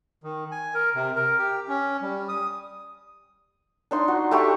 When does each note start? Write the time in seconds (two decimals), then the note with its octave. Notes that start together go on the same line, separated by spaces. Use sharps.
0.24 D#3
0.52 G#5
0.74 A#4
0.95 C3
1.16 A#4
1.38 G4
1.68 C#4
2.02 G3
2.29 D#6
3.91 D4 D#4 C6
4.08 F#4
4.31 A3 G4 B5 C#6